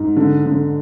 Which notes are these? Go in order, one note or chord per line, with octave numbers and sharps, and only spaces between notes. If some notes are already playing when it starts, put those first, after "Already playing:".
Already playing: G#2
D3
D3